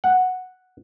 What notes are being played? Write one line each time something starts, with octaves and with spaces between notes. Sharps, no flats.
F#5